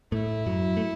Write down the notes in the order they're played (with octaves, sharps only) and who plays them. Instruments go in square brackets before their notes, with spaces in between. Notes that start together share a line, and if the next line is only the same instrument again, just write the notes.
[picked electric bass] A2 A3 [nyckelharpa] E4
[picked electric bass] F#2 F#3
A3